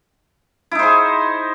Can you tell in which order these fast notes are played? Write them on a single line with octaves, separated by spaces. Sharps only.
E4 D#4 C5 G#4